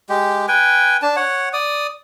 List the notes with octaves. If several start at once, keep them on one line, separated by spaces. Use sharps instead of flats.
G#3 G4
B4 G5 G#5
D4 A5
C#5 F#5
D5 D#6